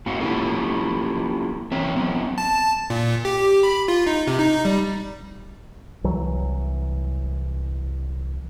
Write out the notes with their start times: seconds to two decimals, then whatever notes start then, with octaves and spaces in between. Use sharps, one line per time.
0.06 A2 C4 F#4 F5
0.21 A#3 C#4 E4 F4 G4 A4
1.71 E3 C4 C#4 C#5 E5
1.96 F#3 B3 C4
2.38 A5
2.90 A#2
3.25 G4
3.63 B5
3.88 F4
4.06 D#4
4.27 C3
4.39 D#4
4.65 G3
6.04 C2 E3 F#3